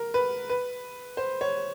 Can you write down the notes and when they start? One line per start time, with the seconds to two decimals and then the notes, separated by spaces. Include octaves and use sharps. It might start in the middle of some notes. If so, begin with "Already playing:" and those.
Already playing: A#4
0.14 B4
0.49 B4
1.17 C5
1.41 C#5